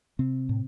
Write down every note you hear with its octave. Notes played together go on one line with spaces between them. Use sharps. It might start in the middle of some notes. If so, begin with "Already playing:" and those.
C3 C4
A2